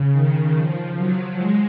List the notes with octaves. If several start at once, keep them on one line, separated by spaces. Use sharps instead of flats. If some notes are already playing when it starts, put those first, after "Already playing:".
Already playing: C#3
D#3
F3
F#3
G#3